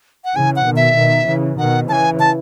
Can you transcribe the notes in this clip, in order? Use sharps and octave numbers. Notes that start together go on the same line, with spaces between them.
F#5
C#3 E3 G#5
F#5
B2 D#3
E5
B2 D#3
C#3 E3
B2 D#3 F#5
C#3 E3 G#5 A5
A5